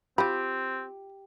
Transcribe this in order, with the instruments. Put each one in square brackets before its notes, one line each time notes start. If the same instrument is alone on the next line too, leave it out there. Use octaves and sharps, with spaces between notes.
[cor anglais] C4 [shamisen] F4 B5 [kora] G4